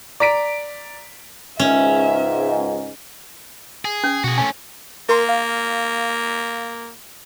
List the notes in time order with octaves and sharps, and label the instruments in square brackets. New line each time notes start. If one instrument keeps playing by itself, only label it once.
[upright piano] D5 A#5 B6 D7
[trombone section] C#2 G#2 [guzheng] C#4 [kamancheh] E5
[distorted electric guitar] G#4
[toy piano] C#4
[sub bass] B2 [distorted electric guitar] F#4 G#4
[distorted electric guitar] A3 C#4 [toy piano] G#5
[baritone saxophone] A#3 [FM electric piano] A#4 C6
[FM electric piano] F5